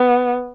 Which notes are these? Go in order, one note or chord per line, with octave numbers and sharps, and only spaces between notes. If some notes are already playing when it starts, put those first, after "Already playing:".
Already playing: B3